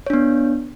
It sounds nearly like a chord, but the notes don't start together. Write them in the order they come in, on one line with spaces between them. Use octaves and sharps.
C#5 D4 B3